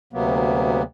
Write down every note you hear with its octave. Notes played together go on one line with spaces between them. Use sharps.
D2 C3 F#3 A#3 B3